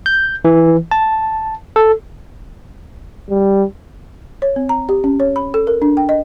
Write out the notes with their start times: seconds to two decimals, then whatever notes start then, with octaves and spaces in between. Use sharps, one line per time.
0.06 G6
0.45 E3
0.91 A5
1.76 A4
3.30 G3
4.42 C#5
4.56 C4
4.69 A#5
4.89 G4
5.04 C#4
5.20 C#5
5.36 B5
5.54 A4
5.67 A#4
5.82 D4
5.97 G5
6.09 D#5